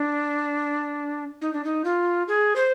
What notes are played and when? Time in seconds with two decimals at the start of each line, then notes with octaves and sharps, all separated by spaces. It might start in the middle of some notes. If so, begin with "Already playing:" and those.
Already playing: D4
1.42 D#4
1.53 D4
1.64 D#4
1.85 F4
2.28 G#4
2.56 C5